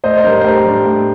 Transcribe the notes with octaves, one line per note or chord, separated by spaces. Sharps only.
A2 C5 D#5
C5
G3 D4 A#4 D5
C5
A2 G4 A#4
G3 D4
A2